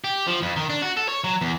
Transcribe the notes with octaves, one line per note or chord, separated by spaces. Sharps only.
G4
F3
F2
D#3
D4
F#4
A4
C#5
F#3
E2